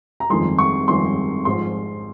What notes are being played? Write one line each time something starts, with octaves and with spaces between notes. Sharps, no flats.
A#5
G1 F2 D#3 G#3 C6
C#6
G1 F2 D#3 G#3 C6
G#1 G#2 F3 C6